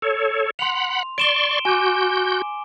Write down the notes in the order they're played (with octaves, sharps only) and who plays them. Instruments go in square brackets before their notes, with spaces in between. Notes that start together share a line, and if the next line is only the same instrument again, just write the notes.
[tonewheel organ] A4 C#5
[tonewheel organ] F#5 B5 [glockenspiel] C6 F7
[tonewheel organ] D5 C6 C#6 [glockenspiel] D7 E7 G7
[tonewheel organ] F#4 G6 [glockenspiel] G#5 D6